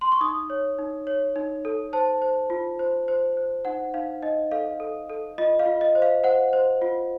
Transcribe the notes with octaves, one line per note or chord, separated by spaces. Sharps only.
C6
C#6
D#4 D#6
C#5
D#4
C#5
D#4
A4
C5 A5
C5
F4
C5
C5
C5
D#4 F#5
D#4 F5
D#4 D#5
A4 F5
A4
A4
F4 D#5
F5
F4
D#5
C5
F5
C5 F#5
C5
F4